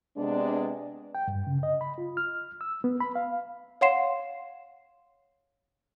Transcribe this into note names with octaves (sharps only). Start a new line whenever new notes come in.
C3 G#3 B3 D4
G5
G2
C#3
D#5
B5
F4
F6
E6
B3
B5
F5
C#5 F5 F#5 C6 C7 E7